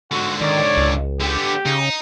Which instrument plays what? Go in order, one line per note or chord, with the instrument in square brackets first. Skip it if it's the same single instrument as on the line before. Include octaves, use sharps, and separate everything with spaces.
[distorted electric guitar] G#2 D3 [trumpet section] F#4
[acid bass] D#3 [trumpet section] C#5 D5
[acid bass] C#2
[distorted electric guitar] D3 B3 [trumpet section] G4
[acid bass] C#3 [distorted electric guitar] D#4